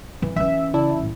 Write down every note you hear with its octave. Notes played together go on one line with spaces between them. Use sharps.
E3
E3 C#4 E5
C#3 E4 D5 A5
C2 A2